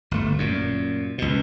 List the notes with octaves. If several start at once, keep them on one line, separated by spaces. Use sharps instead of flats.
G1 D2 A3
F#2 A#2
C#2 B2